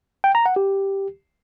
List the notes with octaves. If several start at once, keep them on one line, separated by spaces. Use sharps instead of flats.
G5
A#5
F#5
G4